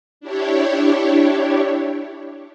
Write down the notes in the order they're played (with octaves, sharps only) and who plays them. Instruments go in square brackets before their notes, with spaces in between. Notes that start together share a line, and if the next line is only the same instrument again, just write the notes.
[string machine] D4 E4 G4 C#5